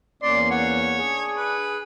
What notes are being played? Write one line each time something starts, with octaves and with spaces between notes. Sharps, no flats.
E2 A#3 C#4 D5 C6
C#5 F#5
D4 G#4
B4